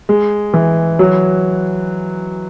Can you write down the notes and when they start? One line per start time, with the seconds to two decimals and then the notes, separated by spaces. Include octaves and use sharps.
0.09 G#3
0.54 E3
0.99 F#3